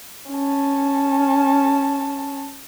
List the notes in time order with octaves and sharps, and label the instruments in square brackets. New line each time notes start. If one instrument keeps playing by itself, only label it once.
[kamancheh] C#4 A5